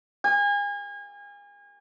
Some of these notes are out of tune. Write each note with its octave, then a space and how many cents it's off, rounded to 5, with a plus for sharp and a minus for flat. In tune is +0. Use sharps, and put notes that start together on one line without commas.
G#5 -35